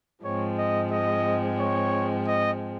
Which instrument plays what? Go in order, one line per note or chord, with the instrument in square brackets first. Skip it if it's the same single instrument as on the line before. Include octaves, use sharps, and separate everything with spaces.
[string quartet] G#2 F3 G#3 C4 [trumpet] C#5
[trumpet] D#5
D#5
C#5
D#5